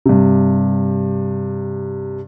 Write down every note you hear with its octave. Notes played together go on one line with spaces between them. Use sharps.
G2 C3